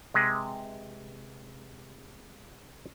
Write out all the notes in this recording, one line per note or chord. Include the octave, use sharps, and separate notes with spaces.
C3 G#3 B4